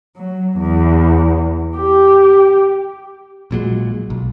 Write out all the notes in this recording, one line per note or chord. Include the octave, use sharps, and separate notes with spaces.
F#3
E2
G4
A#1 A#2 F#3 G#3
B1